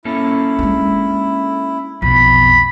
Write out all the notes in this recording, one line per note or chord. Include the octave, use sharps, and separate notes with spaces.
A#3 C#4 E4 A4
G#3 D4
B1 F2 B2 B5